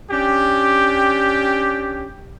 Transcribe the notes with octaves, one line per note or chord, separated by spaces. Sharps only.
C#4 D4 G4